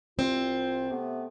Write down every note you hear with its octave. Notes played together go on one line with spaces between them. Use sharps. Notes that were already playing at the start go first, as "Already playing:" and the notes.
C2 C4 F4
C3 A3 B3